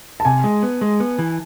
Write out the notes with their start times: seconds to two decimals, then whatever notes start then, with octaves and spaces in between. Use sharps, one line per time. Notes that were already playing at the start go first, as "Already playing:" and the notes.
0.20 A5
0.25 C3 G#5
0.44 G#3
0.63 B3
0.81 G#3
1.00 B3
1.19 E3